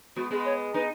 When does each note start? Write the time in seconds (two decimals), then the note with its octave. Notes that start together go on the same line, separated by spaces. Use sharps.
0.16 G#3 B3 F#4
0.31 G#3 B3 G#4
0.45 C#5
0.74 B3 D#4 B4